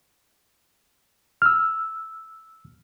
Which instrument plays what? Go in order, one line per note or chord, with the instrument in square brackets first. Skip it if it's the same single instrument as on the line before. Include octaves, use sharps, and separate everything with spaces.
[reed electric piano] E6 F6